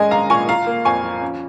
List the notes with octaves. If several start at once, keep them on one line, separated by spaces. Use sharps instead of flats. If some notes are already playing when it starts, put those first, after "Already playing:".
Already playing: G#2 G#3 C#4 D#5 G#5
A#1 F5 A#5
A#2 G#5 C#6
F4 F5 A#5
A#3
F2 G#5 C#6
F3
C#4